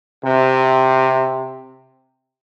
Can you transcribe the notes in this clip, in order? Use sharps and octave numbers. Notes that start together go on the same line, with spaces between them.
C3